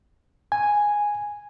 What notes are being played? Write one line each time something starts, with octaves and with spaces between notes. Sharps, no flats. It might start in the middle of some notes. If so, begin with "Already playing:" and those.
G#5